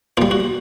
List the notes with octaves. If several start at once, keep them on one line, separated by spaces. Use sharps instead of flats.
A#2 G3 F4
F#4